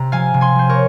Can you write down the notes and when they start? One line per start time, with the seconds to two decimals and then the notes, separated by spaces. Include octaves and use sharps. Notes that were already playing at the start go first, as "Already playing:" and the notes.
Already playing: C3 A#5
0.12 F3 F5 G#5
0.34 C3
0.41 G#5 C6
0.55 F3 C5
0.69 A#4 C#5